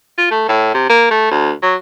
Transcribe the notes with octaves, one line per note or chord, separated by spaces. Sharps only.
F4
A3
A2
C3
A#3
A3
D2
F#3